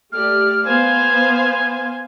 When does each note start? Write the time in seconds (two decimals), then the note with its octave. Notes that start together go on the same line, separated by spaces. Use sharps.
0.12 A3 G4 D5 F6
0.65 B3 C5 F5 G#5